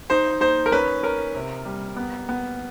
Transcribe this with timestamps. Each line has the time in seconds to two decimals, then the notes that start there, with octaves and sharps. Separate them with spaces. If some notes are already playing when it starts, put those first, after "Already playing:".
0.10 D#4 C5
0.41 D#4 C5
0.66 A#4
0.72 C#4 B4
1.03 C#4 A#4
1.35 C3
1.65 G3
1.97 B3
2.29 B3